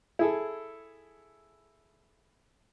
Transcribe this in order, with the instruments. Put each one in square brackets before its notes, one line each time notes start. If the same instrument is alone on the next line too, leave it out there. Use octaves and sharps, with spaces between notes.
[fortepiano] E4 G#4 A4